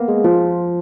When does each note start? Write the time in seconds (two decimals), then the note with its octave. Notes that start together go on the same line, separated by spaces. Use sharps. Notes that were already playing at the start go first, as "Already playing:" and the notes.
Already playing: A#3 B3
0.08 G#3 G#4
0.24 F3 F4